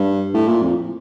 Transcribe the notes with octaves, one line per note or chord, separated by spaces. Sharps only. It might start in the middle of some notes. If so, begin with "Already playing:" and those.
Already playing: G2
A2
A#2
F2